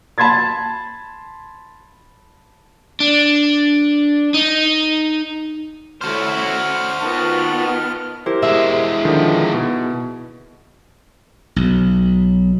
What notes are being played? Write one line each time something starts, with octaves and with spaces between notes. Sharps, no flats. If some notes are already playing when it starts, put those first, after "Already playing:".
A5 B5 C6 G#6 A6
D4
D#4
A3 C#4 E4 F#4 C5 F6
D#3 B3 F4 D#5 A5
E4 G4 A#4 C5
B2 G#3 E5
D3 D#3 F3
B2
B1